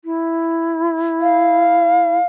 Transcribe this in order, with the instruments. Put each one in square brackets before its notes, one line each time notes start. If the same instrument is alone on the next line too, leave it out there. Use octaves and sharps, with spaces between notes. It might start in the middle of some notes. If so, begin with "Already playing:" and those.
[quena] E4
[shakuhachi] F5